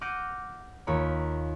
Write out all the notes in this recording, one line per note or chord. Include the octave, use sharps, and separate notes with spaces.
F#5 D6 F6 G6 A#6 D#7
D#2 A#3 F4 C#5 B5